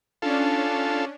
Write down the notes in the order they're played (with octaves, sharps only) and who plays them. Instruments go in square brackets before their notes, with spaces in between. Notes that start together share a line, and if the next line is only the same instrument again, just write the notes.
[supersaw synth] C#4 D4 [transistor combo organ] F4 A4